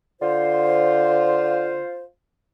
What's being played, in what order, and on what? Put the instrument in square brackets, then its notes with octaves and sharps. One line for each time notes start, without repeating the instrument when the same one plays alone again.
[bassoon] D3 [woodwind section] F4 C5